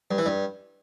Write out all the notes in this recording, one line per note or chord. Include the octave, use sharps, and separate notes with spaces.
G2
E3
G2